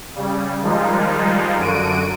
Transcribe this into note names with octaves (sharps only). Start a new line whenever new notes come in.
C#3 G3
D#3 F3 G3 G#3 D#4 F4
F#2 D3 F#4 D7 D#7